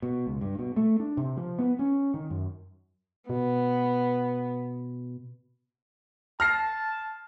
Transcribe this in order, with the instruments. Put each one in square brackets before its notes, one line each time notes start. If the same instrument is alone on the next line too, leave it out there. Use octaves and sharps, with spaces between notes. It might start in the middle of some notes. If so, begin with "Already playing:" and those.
[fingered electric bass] B2
C#2
G2
B2
A3
D4
C3
F3
B3
C#4
D#3
F#2
[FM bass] B2 [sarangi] B3
[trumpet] A5 [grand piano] F6 A#6 C7